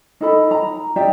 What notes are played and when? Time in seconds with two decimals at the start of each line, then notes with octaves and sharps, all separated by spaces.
0.21 D#4 A4 B5
0.51 A#5
0.96 D#4 G4 D5 E5